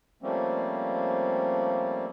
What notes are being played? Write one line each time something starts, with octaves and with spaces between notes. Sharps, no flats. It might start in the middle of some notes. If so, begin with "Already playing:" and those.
F3 G3 A3 A#3 C4 C#4